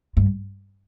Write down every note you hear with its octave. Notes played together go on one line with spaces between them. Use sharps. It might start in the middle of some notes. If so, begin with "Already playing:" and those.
G2